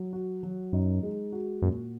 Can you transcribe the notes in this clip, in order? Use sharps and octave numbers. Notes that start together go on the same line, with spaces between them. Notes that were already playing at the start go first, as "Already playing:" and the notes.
Already playing: F#3
F#4
F#3
F#2 D#4
G#3
F#4
F#2 A#2